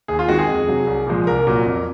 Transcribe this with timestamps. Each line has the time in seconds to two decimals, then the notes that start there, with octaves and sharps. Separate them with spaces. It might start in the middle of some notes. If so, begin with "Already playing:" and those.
0.08 D#2 G#4
0.19 F4
0.28 D#3 G#3 C4 F#4
0.39 G#4
0.49 F2
0.67 C3 F#3
0.87 C2
1.07 A#2 F3 G#3
1.27 C2 A#4
1.47 A#2 F#3 A#3
1.66 F2